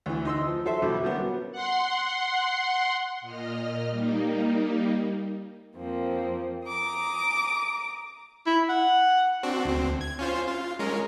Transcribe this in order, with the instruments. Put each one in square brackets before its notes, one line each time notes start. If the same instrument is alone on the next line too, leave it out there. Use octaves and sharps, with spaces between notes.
[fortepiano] D2 E3
D#4 C6 E6
F3
F#3 A4 C5 E5
B2 D3 G3 E4
F#3 G3 A#3 B3 C#4
[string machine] F#5 C6
A#2 D#5 F6
G3 A#3 D#4
[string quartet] F2 F3 A#3 C4
A#5 D6 D#6
[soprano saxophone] E4
F#5
[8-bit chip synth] C4 D4 F#4
D2 C4
G#6
C#4 F4 C5
F4
G#3 C#4 A#4